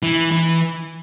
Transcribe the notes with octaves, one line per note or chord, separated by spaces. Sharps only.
E3
E3